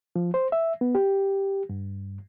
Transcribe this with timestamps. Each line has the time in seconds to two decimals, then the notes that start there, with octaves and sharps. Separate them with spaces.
0.16 F3
0.34 C5
0.52 E5
0.81 B3
0.95 G4
1.69 G2